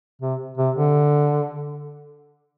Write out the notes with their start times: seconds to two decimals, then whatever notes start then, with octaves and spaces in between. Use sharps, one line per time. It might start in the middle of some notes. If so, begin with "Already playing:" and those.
0.22 C3
0.57 C3
0.75 D3